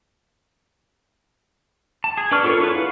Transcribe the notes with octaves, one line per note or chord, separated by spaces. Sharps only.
A5
G#4
D4 B4 D5 C#6 F6
B3 F4 A4 A#4 C#5
E4 F4 G#4 B4
F5 F#5